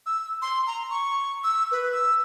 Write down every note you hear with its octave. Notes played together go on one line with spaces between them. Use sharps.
E6
C6
A#5
C#6
E6
B4
E6